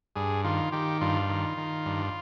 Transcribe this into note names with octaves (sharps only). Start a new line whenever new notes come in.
G2 G#4
D#3 F4
D#3 G4
G2 F4
D#3
D#3
G2